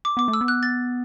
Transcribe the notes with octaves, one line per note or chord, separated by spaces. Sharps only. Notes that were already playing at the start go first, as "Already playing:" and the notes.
D6
B3 D6
A3
E6
B3
F#6
A6